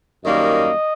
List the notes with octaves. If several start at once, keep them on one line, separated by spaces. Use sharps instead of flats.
F#2 D#3 G3 A#3 D#5